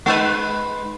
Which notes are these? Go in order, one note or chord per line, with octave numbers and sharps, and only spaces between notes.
G#3 D#4 B4